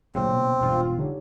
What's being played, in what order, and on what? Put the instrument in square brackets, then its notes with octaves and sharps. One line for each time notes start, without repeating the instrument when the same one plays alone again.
[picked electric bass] D2 A#2 C#3 [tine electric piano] F#3 [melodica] C4
[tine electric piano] B2 B3
[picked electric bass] E1 G2 [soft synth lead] F4
[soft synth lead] D3 [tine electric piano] D#4 G4 C#5